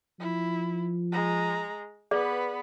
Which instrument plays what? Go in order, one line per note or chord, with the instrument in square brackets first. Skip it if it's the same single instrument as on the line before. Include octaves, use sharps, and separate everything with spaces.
[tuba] F3 [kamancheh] E4
[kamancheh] G#3 A#5
[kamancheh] B3 B4 [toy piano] G#4 D5